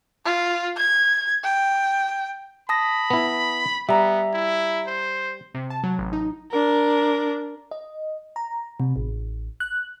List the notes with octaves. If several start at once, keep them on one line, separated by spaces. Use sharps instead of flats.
F4
G#6
G5
A5 B5 D#6 A#6
B3 E4
G3 B3 E5 A#5
E4
C5
C3
A5
F#3
A1
D#4
D4 A#4
D#5
A#5
C3
A1
F#6